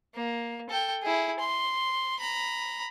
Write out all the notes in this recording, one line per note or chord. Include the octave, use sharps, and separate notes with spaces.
A#3
A4 G5
E4 G#4
C6
A#5 B5